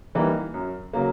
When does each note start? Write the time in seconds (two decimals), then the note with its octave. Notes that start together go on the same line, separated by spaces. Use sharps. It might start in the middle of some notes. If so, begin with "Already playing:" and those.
0.15 E3 G3 A#3 D#4
0.54 F#2
0.93 C#3 F#3 A#3